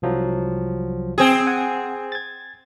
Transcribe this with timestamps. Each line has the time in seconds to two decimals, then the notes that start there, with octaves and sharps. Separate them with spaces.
0.02 C2 F3 F#3
1.18 C4 G#4
1.47 F#5 G#5
2.12 G#6 A6